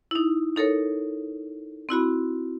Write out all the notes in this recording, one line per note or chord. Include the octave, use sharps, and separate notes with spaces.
D#4 E4
D#4 A4 A#4 C#5
C4 E4 F#4 B5